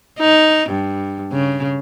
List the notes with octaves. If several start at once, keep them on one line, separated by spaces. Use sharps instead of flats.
D#4
G2
C#3